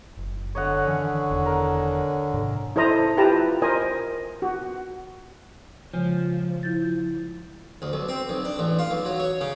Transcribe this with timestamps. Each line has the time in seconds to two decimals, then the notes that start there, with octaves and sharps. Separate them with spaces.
0.17 F#1
0.55 D3 C#5 D#5 F#5
0.87 D#3 E3 C#4
1.30 E1 E2 D#3
1.45 A#4
2.34 G#2 C3 D#3
2.76 E4 A4 C5 D#5 A#5
3.17 E4 F4 G4 B4 A5 A#5
3.62 A#4 C5 D#5 G#5
4.42 F#4
5.94 C#3 F3 G#3
6.63 E4 G6 A6
7.82 D2
7.93 B1
8.08 C4
8.29 B1
8.45 D4
8.59 A1
8.79 F4
8.91 B1
9.05 F#3
9.20 C#5
9.41 C#3